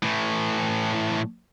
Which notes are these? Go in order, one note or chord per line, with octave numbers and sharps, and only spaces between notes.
A2 E3